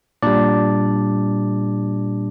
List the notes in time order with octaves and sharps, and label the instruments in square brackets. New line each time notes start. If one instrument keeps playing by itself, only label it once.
[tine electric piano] A#2 G3 D4 D5